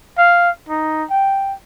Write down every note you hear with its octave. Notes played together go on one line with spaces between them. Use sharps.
F5
D#4
G5